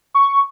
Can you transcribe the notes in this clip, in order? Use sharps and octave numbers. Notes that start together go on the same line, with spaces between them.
C#6